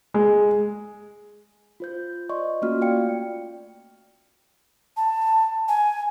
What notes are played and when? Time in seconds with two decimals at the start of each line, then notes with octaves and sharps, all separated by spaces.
0.14 G#3
1.80 F4 C5 G6
2.29 D5 D#5 C6 C#6
2.62 A3 A#3 C#4 F4 F#4 F6
2.82 D5 F5 G5 C#7
4.97 A5
5.68 G#5